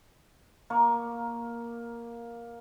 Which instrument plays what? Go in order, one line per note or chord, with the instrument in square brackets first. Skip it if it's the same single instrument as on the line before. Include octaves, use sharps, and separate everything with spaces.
[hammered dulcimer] A#3 C#6